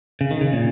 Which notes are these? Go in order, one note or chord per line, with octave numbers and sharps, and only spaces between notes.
C#3
D#3
C#3
A#2